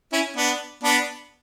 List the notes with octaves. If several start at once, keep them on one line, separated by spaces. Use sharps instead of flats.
C#4 E4
B3 D4
B3 D4